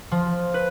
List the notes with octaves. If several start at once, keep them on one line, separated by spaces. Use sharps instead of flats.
F3
B4